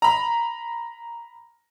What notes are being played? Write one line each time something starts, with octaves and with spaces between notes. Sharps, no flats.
A#5 B5